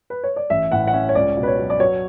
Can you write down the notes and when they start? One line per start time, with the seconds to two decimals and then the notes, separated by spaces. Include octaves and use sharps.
0.10 B4
0.24 C#5
0.36 D5
0.50 A1 E5
0.71 A2 F#5
0.87 F#5
0.93 C#4 E5
1.09 C#5
1.15 C#2 D5
1.37 B2
1.43 B4
1.48 C#5
1.59 F#3
1.70 D5
1.80 F#3 C#5